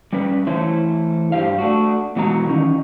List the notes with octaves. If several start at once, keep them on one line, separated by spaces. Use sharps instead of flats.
G3 C#4 B4
E3 A3 E4 C5 C#5
G2 G4 C5 F5
A3 D4 F#4
B2 E3 G#3 F#4 A#4 A#5
D#3 E3 C#4 D#4